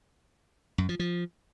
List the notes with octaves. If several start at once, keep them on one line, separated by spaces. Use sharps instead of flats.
F#2
F3
F3